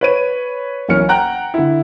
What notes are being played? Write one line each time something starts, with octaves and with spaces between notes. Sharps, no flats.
B4 C#5 D#7
B1 E3 C#4 A#4 F6 C#7
F#5 G5 A#5 F#6
D3 E4